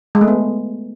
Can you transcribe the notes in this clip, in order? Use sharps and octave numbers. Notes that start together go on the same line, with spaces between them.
G#3
A3
B3